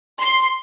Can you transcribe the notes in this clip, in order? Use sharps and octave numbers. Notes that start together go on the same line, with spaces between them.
C6